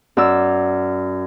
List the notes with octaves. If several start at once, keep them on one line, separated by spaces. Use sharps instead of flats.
F#2 D5 E6